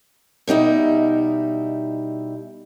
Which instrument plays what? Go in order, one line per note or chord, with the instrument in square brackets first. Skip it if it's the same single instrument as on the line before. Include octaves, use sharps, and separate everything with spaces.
[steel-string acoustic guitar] B2 G3 D#4 E4